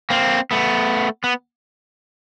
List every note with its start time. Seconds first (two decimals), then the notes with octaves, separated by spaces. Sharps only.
0.10 A#3 C4
0.51 A3 B3
1.24 B3